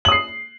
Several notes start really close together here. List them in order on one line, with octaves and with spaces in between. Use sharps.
F#7 D#6 C7